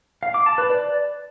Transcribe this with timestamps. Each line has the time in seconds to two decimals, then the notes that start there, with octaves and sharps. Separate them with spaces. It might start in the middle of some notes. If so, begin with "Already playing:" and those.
0.23 F5
0.34 D6
0.46 A5
0.58 B4
0.70 D5